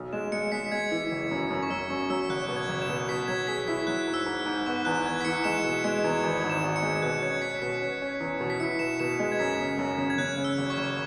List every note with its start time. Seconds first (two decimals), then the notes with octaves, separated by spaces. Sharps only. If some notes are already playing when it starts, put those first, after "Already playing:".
Already playing: B1
0.13 G#3 E7
0.32 G#3 C#7
0.52 G#3 B6
0.71 G#3 G#6
0.91 E3
1.11 F#1
1.31 F#2
1.50 F#2
1.63 C#6
1.70 F#2 E6
1.90 F#2 C#6
2.10 F#3 E6
2.29 F#1 F#6
2.49 B2
2.56 G#6
2.69 F#1
2.82 E7
2.89 B2
3.09 B2 B6
3.28 F#3 G#6
3.47 G#4 B6
3.68 E4 B6
3.87 F#3 F#6
4.07 G#2
4.14 E6
4.26 G#2
4.39 E6
4.46 G#2
4.66 B3 C#6
4.85 E2 F#6
5.06 B3 G#6
5.21 B6
5.25 E3 C#7
5.44 G#3 E7
5.64 B2 E7
5.84 G#3 C#7
6.04 E2 G#6
6.23 G#1 G#6
6.44 G#2
6.49 E7
6.64 G#1 E7
6.76 C#7
6.82 G#3
7.02 B2 F#6
7.22 C#4 G#6
7.42 C#4 B6
7.62 B2 B6
7.82 C#4
8.02 C#4
8.20 E2
8.40 B2
8.50 B6
8.60 E4 C#7
8.79 B2 E7
8.99 B2 E7
9.19 G#3
9.32 G#6
9.39 F#2 B6
9.59 C#3
9.78 F#2
9.98 C#3
10.10 G#6
10.18 C#3 F#6
10.37 C#3
10.44 E6
10.58 F#1
10.70 C#6
10.77 F#1